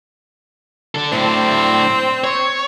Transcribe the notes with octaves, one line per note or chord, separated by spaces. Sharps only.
D4 A4
A2 C4 D4
C#5